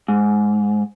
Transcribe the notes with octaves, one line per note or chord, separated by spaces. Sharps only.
G#2